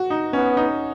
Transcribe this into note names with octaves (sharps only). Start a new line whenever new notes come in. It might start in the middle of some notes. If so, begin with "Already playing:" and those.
Already playing: F#4
D#4
B3 C#4
D#4